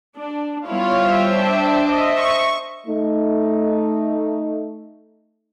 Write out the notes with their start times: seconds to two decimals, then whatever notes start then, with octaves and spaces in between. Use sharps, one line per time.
0.17 D4
0.68 G3 B3 E4 F4 C#5
1.05 C5 E5 G5
1.38 D4
1.89 C5 D#5 E5
2.18 C#6
2.87 A3 D#4